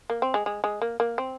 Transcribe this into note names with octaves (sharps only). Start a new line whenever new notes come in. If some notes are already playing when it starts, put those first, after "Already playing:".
A#3
C4
G#3
G#3
G#3
A#3
A#3
C4